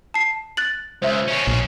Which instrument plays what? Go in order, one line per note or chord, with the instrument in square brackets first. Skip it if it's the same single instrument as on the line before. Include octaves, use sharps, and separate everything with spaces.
[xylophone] A5 C7
F#6 A6 F#7
[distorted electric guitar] C#2 [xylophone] C5 E5
[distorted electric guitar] B2 C#4
[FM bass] A#1